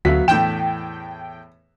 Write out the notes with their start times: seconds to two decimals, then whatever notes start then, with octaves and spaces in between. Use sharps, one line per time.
0.05 D2 F#3 B3 F#4 E5 F5 B6
0.28 E2 A2 G5 E7